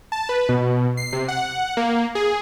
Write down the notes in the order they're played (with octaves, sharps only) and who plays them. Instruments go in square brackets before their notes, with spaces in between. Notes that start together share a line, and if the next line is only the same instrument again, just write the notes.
[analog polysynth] A5
B4
B2
C7
C3
F#5
A#3
G#4